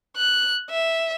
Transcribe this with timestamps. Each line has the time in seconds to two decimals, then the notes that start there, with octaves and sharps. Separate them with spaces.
0.16 F#6
0.70 E5